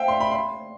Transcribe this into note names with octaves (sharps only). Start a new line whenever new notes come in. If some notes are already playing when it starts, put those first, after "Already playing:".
Already playing: C5 E5 F5 G5
C6
B5
C6